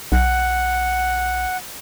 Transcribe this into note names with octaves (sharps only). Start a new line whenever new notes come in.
B1 F#5